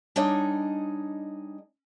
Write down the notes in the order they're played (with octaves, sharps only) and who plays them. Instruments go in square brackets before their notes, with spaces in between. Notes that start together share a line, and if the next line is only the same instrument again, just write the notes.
[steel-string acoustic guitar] G3 D4 D#4 G#4 C#5 D#5